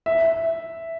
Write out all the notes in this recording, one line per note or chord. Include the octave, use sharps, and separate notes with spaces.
E5